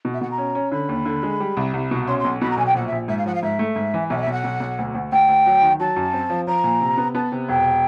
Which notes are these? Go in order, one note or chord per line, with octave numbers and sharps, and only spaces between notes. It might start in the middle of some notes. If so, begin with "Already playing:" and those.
B2
E5
B2 F#5
A#5
C#4
C#4
D3 B5
D#2
D3
G#3
G3
C2
C2
B2
C#4 C6
C6
B1
B2 B5
A#5
B1 G#5
G5
A#1 F#5
E5
A#1
G#2 E5
F5
F3 F#5
F5
G#2 E5
A3
G#2
E3
B1 E5
D#5
E5
B1
F#5
B1
B1
D2
D2
D2 G5
D2
F#3
D#3
F#3 A5
F#2
C4
F3
F3 A#5
A#2
C3
B3
B3 A5
C3
E1 G5